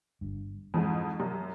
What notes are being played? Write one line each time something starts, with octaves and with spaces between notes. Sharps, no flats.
G1 G2
F2 G#2 E3
F#2